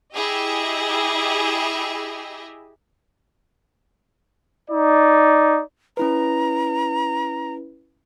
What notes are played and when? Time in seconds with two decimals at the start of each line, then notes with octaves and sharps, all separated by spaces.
0.15 E4 G4 G#4 D#5 E5
4.71 D#4 D5
5.97 C#4 E4 B4 A#5